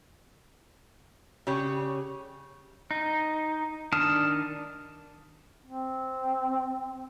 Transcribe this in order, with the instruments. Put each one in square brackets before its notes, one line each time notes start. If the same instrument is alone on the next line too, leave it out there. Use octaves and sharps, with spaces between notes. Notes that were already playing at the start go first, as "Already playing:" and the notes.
[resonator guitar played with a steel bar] C#3 G4 C#5
[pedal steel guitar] D#4
D#3 D4 A5 D#6 F6
[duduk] C4